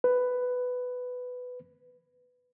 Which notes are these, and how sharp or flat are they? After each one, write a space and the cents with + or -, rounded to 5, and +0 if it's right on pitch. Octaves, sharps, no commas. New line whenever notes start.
B4 +10